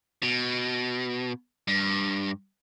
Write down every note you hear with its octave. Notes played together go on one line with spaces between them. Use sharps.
B2
G2